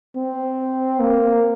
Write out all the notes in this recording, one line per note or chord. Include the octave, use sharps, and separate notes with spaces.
C4
A#3